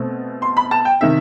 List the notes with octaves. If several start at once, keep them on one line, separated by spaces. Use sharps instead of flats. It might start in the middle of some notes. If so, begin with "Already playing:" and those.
Already playing: B2 A3 C4
C6
B5
A5
G5
C3 D#3 E5